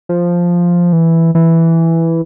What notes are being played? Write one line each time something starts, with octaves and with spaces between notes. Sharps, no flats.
F3
E3
E3